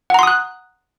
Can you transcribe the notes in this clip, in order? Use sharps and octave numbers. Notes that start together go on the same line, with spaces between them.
F#5 A#5 C6 D#6 F#6